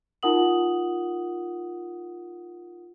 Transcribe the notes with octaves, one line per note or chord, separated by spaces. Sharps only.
D#4 F4 A#4 F#5 D#6 F#7